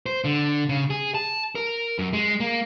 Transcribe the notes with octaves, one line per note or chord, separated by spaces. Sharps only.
C5
D3
C#3
G#4
A5
A#4
F#2
G#3
A#3